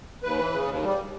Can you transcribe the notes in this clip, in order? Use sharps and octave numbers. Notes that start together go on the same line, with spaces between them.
D#2 B4
E3
C#3
D#2
G3